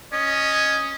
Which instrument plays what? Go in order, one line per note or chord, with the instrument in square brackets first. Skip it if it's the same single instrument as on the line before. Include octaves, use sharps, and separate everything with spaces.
[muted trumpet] C#4 [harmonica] D#5